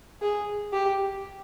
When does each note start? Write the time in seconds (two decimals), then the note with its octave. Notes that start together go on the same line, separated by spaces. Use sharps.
0.22 G#4
0.73 G4